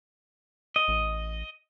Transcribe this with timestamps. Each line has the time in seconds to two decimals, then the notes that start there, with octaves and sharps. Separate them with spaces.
0.76 D#5
0.88 A1